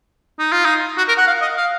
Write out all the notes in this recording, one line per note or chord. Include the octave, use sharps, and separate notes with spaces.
D#4
F4
D#4
F#4
A#4
F#5
F5
D#5
F5